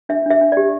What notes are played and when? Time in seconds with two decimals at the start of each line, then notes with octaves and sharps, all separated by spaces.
0.09 D4 E5
0.26 D4 E5
0.41 D4
0.52 G4 D5